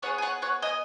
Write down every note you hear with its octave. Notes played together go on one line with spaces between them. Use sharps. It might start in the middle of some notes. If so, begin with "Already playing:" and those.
B3 G#4 C#5 F#5
G#5
C#5 F#5
C#5 F#5
D#5 G#5